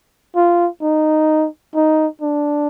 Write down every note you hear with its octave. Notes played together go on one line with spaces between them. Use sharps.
F4
D#4
D#4
D4